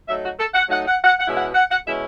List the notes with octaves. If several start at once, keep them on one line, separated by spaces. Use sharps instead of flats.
F#3 A3 D#4 E5
F#4
A4
F#5
F#3 A3 D#4 F#5
F#5
F#5
F#5
B2 G#3 C#4 E4
F#5
F#5
F#5
B2 G#3 C#4 E4 E5